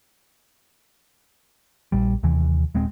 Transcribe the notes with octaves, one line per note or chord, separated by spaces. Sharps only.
A#1 G3
D#2 C3 E3
D#1 G#3 C4